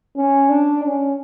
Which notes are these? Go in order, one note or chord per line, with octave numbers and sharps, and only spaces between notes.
C#4
D4
C#4